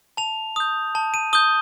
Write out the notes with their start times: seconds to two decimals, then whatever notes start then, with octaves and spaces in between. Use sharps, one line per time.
0.17 A5 F7
0.56 D#6 G6
0.95 A5
1.14 D#7
1.33 D#6 G6 G7